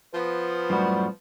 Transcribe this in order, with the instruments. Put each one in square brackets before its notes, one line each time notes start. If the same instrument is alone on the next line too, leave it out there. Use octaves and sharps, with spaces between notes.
[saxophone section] F3 B3 [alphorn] B4
[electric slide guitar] F#2 A2 F#4 [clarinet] G3